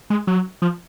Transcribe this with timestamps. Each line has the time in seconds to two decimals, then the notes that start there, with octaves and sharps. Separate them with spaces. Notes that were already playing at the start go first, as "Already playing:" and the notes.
0.10 G#3
0.27 F#3
0.62 F3